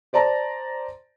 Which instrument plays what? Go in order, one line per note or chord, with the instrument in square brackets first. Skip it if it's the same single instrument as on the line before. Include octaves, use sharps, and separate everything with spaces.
[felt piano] C5 D5 A5 A#5